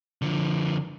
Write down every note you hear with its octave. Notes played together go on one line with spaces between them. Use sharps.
D3 F3